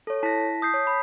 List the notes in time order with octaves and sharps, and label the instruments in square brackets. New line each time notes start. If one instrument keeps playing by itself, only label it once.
[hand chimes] A4 C#5
[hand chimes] E4 A#6 [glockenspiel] A5 B6
[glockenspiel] D#6 G6 C7
[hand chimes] C#5
B5